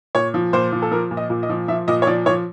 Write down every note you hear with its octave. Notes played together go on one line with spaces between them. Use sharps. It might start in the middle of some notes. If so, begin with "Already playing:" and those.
A#2 C#5
F3
A#2 C5
F3
A4
F3 A#4
A#2
D#5
A#2
D#5
F3
F3 E5
A#2 D#5
C#5
F3 D5
F3 C#5